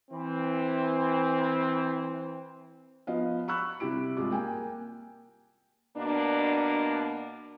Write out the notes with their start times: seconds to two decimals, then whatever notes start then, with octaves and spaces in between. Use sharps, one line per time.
0.11 E3 C4
3.07 F3 B3 D#5 F5
3.48 B5 C#6 E6 F#6
3.80 C3 G3 E4 G4 D7
4.17 C2 G#3 F4 D6
4.30 A#3 G5 G#5
5.96 B2 A#3 D4